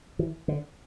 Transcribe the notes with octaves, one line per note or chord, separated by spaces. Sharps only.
E3
D3